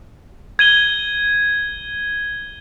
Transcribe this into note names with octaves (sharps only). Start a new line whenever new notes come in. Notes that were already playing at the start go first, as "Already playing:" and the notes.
G#6 D#7 G7